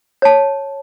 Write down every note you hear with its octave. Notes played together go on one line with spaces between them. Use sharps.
C#5 A5